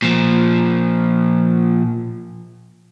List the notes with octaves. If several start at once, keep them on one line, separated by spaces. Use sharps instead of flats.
A#2 F3